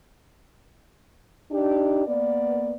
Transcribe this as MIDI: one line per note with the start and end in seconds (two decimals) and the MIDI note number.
1.52 2.05 62
1.52 2.05 63
1.52 2.05 67
2.07 2.74 58
2.07 2.74 59
2.07 2.74 74